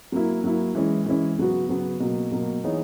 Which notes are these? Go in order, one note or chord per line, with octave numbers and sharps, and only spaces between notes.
F#3 A#3 E4
F#3 A#3 E4
E3 G#3 C#4 E4
E3 G#3 C#4 E4
C#3 F#3 B3 F#4
C#3 F#3 B3 F#4
B2 F#3 A#3
B2 F#3 A#3
E3 B3 D#4 G#4 C#5